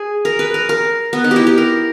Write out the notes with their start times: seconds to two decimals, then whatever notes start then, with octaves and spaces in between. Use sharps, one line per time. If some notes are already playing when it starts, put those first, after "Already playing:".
Already playing: G#4
0.25 A#4
0.39 B4
0.54 A#4
0.69 A#4
1.13 B3
1.24 D#4
1.31 G4
1.36 E4
1.47 G4
1.58 A#4